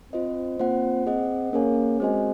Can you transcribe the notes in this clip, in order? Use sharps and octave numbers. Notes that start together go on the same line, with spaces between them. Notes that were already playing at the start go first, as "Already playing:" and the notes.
C4 F4 C5 D#5
A#3 C4 F4 C5 F#5
C4 G#4 D#5 F#5
A#3 C#4 G#4 C#5 G#5
G#3 C4 F#4 C5 D#5 G#5